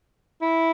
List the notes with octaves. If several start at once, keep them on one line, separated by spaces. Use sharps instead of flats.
E4